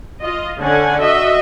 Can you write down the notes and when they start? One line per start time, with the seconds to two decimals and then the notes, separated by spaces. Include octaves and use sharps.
0.22 F4 D#5
0.60 D3 C#4 F#5 G#5
1.01 F#4 D#5 E5